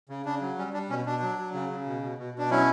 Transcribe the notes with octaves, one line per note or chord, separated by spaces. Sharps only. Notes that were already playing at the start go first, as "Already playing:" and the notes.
C#3
C#3 D4
F#3
G3 C#4
G3 D4
B2 C#4
B2 D4
F#3
F#3
C#3
C#3
B2
B2
B2
B2 D4
F#3 C#4 E4